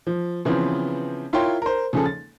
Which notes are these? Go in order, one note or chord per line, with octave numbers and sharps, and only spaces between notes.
F3
C#3 E3 F3 B3 C4
E4 F4 A#4 C#5 G5 C6
A#4 C5
C#3 F3 C#4 G#4 A4
A6